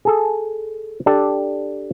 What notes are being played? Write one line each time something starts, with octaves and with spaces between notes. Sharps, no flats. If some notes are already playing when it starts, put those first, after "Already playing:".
G#4 A4
D4 G4 A4